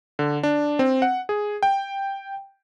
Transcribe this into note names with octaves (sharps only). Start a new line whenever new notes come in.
D3
D4
C4
F#5
G#4
G5